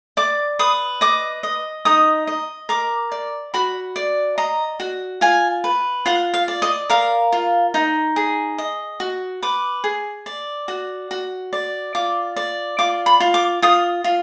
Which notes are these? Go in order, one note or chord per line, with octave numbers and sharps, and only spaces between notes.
D5 D6
B4 D#6
D#5 D6
D#5
D#4 D#6
D#5
A#4 D6
D5
F#4 B5
D5
D#5 A#5
F#4
F4 G#5
B4
F4 F#5
F5
D5
D#5
A#4 F5
F4
D#4
G#4
D#5
F#4
B4 D6
G#4
D5
F#4
F#4
D5
F4 D6
D5
F4 D6
B5
F4
D6
F4 D#6
F4